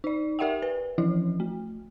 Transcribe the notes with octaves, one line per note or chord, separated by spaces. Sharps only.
D#4 D5
G4 A#4 D5 E5 F#5 G5
B4
E3 F3 E4
A3